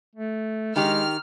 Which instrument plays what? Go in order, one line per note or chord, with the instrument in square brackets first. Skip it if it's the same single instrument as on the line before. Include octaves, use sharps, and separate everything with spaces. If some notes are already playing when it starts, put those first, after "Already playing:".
[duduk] A3
[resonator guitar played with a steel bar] D#3 D#4 G4 [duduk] G#3 [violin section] F6